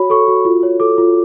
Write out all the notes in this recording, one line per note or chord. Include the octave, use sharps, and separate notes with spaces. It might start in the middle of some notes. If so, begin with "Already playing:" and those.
Already playing: F#4 C#5 B5
A4 C#6
F#4
F4
C#5
A4 D6
F4